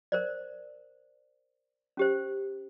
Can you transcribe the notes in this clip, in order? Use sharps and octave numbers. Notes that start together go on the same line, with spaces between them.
A#4 C5 D5
C#4 G4 C5